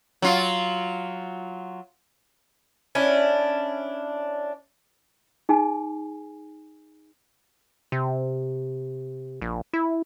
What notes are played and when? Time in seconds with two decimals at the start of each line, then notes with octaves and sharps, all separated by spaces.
0.22 F#3 F4
2.95 C#4 D4 E4
5.49 D#4 G#4 G#5
7.92 C3
9.42 A#1
9.73 E4